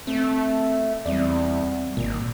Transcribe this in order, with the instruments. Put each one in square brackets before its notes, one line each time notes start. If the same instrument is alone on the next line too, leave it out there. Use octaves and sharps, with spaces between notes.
[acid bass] A3 [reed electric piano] C4
[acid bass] E2 [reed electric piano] G3 C4 D5
[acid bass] G#1 [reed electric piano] A#2